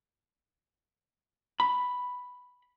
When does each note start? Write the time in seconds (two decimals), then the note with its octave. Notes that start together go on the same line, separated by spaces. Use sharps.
1.60 B5